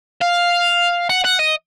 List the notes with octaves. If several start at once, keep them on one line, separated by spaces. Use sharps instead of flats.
F5
F#5
F#5
D#5